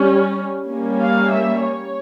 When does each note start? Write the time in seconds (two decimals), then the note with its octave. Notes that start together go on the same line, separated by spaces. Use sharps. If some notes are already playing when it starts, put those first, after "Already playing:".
Already playing: G3 C#4
0.68 G3 A#3 C#4
0.99 F5
1.30 E5
1.61 C#5